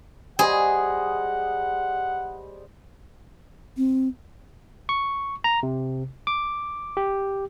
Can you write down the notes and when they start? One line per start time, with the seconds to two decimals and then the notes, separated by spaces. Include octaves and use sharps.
0.39 G3 G#4 C5 D#5 F#5
3.77 C4
4.89 C#6
5.44 A#5
5.63 C3
6.27 D6
6.97 G4